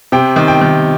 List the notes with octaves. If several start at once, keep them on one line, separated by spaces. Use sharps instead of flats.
C3 G5
D#3
G5
D#3